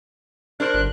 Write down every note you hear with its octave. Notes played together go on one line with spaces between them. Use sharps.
D4 A#4 C5 F#6
G1